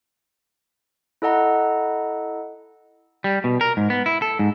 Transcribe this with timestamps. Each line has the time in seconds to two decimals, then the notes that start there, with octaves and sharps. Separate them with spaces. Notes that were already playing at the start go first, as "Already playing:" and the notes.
1.22 E4 A4 D#5 F#5 A#5
3.24 G3
3.44 B2
3.61 A#4
3.77 G#2
3.90 B3
4.06 E4
4.22 A4
4.39 G#2